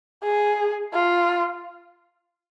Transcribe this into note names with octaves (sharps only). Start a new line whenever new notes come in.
G#4
F4